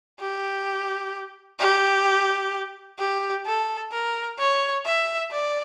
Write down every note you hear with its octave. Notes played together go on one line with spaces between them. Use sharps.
G4
G4
G4
A4
A#4
C#5
E5
D5